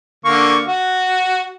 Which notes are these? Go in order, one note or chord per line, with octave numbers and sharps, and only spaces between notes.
D3 A#3 C#6
F#4